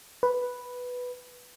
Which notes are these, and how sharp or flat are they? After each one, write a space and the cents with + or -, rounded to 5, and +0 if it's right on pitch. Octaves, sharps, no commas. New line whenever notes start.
B4 +0